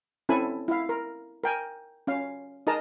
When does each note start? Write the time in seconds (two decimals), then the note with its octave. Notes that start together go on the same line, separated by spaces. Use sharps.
0.29 C4 C#4 E4 A4 G#5 B5
0.68 E4 F5
0.89 A#4
1.44 A#4 G5 G#5
2.07 C#4 F5
2.67 D#4 G#4 A#4 D#5 A5 A#5